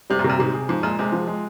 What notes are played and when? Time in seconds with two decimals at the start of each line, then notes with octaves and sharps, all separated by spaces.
0.10 C3 G3
0.19 A#2
0.24 C3
0.30 A#2
0.39 G#2 C3
0.54 G#4
0.69 G#2 F3
0.83 A#2 G#3
0.99 C3 G#3
1.12 F3
1.27 G#3